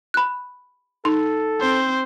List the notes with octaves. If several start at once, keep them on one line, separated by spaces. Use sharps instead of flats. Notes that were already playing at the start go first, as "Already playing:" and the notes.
B5 F#6
D#4 A4 C6
C4 C5